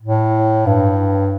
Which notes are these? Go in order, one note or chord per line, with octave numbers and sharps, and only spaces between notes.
A2
G2